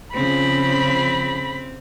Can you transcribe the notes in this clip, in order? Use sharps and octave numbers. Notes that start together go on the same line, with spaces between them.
C#3 F3 C4 B5